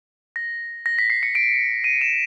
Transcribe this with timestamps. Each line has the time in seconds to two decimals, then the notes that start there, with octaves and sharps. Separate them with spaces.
0.36 A#6
0.86 A#6
0.99 B6
1.10 C7
1.23 C#7
1.35 D7
1.84 D#7
2.01 E7